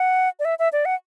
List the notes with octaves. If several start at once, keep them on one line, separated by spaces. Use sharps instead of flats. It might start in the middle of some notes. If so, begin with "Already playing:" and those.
Already playing: F#5
D5
E5
E5
D5
F#5